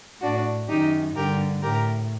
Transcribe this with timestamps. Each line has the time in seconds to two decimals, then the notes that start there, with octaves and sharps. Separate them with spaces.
0.21 A2 D4 F#4
0.68 F#2 D#3 D#4 G4
1.15 G2 D3 G4 A#4
1.62 A2 G4 A#4